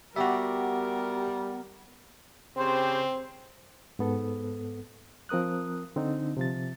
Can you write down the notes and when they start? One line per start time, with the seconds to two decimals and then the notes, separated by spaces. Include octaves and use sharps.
0.16 G3 B3 F#4 G4 A#4 E5
2.57 C#3 C4 G4 C5
3.99 G#2 B3 A4
5.29 F3 C4 A#4 D#6 F#6
5.96 D3 C4 D4 D#4
6.37 C3 F3 A6